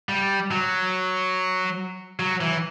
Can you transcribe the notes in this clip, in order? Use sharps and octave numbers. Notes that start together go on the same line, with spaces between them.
G3
F#3
F#3
E3